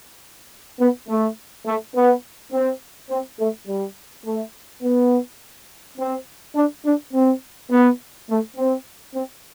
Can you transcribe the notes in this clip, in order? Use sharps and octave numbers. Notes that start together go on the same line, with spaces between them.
B3
A3
A3
B3
C4
C4
A3
G3
A3
B3
C4
D4
D4
C4
B3
A3
C4
C4